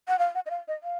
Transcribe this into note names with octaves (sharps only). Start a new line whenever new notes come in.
F#5
F5
F#5
D#5
F5
D#5
F5